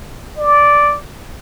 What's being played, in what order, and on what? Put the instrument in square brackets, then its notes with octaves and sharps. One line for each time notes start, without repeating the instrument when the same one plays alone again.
[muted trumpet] D5